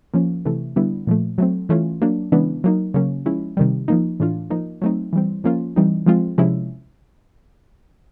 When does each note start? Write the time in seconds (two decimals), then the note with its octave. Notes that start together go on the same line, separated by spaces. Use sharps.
0.14 F3 A#3 C#4
0.45 C3 E3 A3
0.76 D3 G3 B3 E4
1.07 A#2 F3 A3
1.38 F#3 A3 C4
1.69 E3 A3 C#4 F4
2.02 F#3 A#3 D4
2.32 C#3 E3 G#3 B3 D4
2.64 F#3 A#3 D#4
2.94 C#3 F#3 A#3 C#4
3.26 F3 G#3 C#4 E4
3.57 C3 D#3 G3
3.88 F3 A#3 D#4
4.20 A2 E3 A3 D4 F4
4.50 F3 A#3 D#4
4.82 F#3 A3 C4 D#4
5.13 E3 G3 C4
5.44 F3 A#3 C#4 F4
5.76 E3 G3 C4 D#4
6.06 F3 G#3 C4 F4
6.38 C3 F3 G#3 C#4 E4